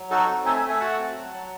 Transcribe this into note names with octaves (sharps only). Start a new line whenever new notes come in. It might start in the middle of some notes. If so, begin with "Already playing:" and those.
Already playing: F#3
D#4 F#4 A4
C4
A3 E5 G#5
E5 G#5
A3
E5 G#5
F#4 F#5 A5
C4
F#3
F#3